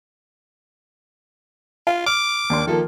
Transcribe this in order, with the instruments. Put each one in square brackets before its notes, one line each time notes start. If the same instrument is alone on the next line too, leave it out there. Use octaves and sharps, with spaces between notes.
[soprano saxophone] F4 [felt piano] F5
[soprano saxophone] D6 [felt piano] F6
[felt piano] D#2 D4 C6
[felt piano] D#3 F3 A#3 [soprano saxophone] A4